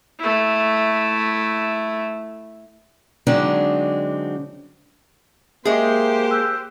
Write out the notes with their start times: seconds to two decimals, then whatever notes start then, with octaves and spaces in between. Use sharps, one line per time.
0.19 A3 E4
3.27 D3 F#3 G#3 C4 D4 D#4
5.65 G#3 A#3 G4 G#4 C5 E5
6.31 E6 F#6 G6